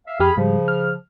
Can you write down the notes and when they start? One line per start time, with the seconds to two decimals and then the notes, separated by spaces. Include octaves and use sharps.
0.06 E5 F5
0.20 F2 G4 G#4 B5 F6
0.37 G#2 C#3 F3 G3
0.68 F6